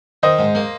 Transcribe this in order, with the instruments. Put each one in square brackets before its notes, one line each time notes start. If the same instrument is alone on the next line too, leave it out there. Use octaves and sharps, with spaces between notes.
[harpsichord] D#3 [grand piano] C5 D#5
[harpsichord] G#2
A#3